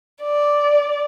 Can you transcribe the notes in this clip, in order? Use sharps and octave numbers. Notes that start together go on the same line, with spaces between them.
D5